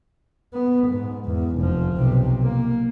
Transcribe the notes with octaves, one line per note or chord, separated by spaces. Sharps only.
B3
G#2
E2
F1 F3
B1 C3
A#3